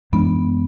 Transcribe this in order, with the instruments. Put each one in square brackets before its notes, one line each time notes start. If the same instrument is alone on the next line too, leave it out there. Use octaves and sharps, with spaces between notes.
[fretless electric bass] F#2 E3 G#3 D4 [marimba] B3